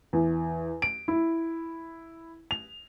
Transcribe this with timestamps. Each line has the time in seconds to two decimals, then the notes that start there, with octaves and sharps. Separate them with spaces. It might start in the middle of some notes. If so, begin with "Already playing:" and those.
0.13 E2
0.82 D7
1.08 E4
2.51 F7